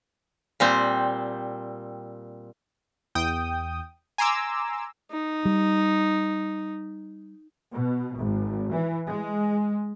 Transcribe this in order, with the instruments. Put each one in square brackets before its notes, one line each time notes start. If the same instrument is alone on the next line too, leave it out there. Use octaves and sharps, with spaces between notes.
[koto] A#2 G3 C4
[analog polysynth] E2 G5 D#6
G#5 A#5 C6 D6 E6
[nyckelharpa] D#4
[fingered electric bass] G3
[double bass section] B2
G#1
E3
G#3